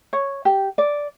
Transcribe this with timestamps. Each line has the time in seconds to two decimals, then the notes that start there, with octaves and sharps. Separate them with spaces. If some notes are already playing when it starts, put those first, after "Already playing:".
0.13 C#5
0.45 G4
0.78 D5